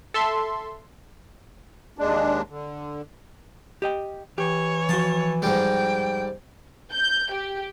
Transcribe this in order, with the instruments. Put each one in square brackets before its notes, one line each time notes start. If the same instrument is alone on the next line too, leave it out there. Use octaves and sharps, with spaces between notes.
[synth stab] A4 E5 C6
[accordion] D#2 G#3 D4
D3
[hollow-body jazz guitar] G4 D#5 G5
[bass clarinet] E3 [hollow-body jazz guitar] G4 [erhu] C#5
[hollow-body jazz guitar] F3 F#4 [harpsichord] A5
[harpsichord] G#2 G3 [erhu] G5
[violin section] G6
G4